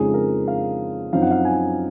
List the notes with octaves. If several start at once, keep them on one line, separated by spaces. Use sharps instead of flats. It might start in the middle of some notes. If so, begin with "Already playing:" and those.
Already playing: F2 C#3 F3 G#3 D#4 G#4
A#4
F5
F#2 F3 C4 D#4 F5
F#5
F5
G#5